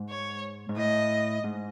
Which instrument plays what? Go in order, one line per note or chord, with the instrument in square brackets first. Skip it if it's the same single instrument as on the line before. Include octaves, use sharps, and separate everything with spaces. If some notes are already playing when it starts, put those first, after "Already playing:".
Already playing: [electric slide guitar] G#2
[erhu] C#5
[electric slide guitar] G#2
[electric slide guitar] A2 [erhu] D#5
[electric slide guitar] G#2